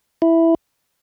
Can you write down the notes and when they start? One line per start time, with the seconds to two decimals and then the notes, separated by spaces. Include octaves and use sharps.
0.22 E4